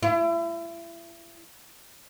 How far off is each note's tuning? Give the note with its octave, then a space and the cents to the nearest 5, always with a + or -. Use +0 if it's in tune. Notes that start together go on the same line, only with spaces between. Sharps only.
E4 +35